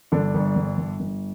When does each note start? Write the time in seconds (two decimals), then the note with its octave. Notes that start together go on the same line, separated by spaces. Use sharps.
0.12 G1 D3 D4
0.34 G1
0.56 G1
0.78 G1
1.00 G1